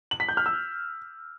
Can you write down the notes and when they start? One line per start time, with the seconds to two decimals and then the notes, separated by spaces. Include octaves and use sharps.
0.11 F#7
0.20 B6
0.29 G6
0.37 F6
0.46 E6